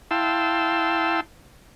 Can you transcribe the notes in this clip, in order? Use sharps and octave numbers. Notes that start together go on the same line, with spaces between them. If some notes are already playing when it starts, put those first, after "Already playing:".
E4 F5 G5 A5 C6 E6